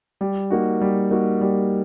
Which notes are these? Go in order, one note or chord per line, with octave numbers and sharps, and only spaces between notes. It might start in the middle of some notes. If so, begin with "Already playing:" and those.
G3
A#3 D#4 F#4
G3
A#3 D#4 F#4
G3